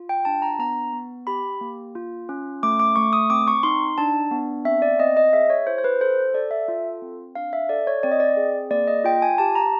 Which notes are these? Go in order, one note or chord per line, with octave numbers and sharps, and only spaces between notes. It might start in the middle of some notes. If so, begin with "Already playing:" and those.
Already playing: F4
G5
D4 A5
A#5
B3 A#5
B3
G4 B5
A#3
F4
C#4
A3 D6
D6
A3 C#6
D#6
C4 D6
C#6
D#4 C6
D4 A5
B3
C4 E5
D5
C4 D#5
D#5
G#4 E5
C#5
E4 C5
C5
B4
A4 C5
A4 D5
E5
F4
C4
D4 F5
E5
A4 D5
C#5
C4 D5
D#5
D5
G#4
A#3 D5
D#5
F4 G5
G#5
G4 A5
A#5